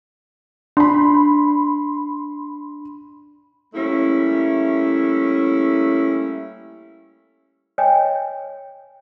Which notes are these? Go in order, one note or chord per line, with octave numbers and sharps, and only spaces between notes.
D4 B5 C6
G3 A3 A#3 C#4 E4
C#5 D#5 G5 G#5